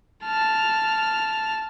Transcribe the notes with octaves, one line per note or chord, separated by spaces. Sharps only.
A5 F6